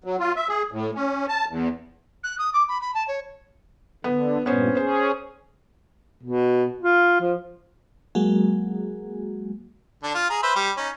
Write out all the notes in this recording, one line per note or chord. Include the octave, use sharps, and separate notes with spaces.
F#3
F4
E5
G#4
A2
C#4
A5
E2
F#6
D#6
D6
B5
B5
A5
C#5
D3 B3
G2 A#2 B3 C#4 C5
C#4 G#4 C5
B2
F4
F3
F#3 G#3 A#3 F#4 G#4
D3 D4
F4
G#4 A#5
B4 C5 E5
G3
C#4 D#4